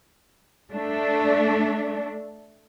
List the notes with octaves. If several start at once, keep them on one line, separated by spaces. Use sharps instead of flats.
A3 D4